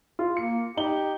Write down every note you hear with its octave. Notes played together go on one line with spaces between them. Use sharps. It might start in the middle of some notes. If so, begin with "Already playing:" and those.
F4
A#3 C#7
D#4 G4 D#5 G7